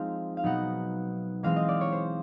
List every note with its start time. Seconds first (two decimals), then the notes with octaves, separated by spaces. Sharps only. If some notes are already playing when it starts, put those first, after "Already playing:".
Already playing: F3 G#3 C4 D#4 F5
0.37 F5
0.44 B2 F#3 B3 D#4 F#5
1.43 E3 G#3 C4 F5
1.56 D#5
1.69 D5
1.81 C#5
1.92 C5